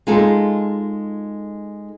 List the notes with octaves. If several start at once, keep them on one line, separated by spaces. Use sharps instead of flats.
G#3 D#4 F4 G#4 A4